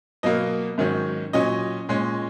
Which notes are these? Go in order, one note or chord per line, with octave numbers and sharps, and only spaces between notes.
B2 F#3 A#3 D#5
G#2 D#3 F#3 C#4
A#2 F#3 C#4 D#5
A#2 G#3 C#4